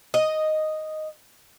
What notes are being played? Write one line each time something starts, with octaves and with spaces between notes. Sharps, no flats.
D#5